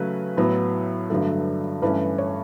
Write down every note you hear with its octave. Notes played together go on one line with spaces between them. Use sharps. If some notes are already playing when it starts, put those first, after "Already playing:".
Already playing: C#3 F#3 A3 C#4 B4
A2 F#3 B3
G2 D3 F#3 A3
G2 E3 A3 C#4 B4
C#5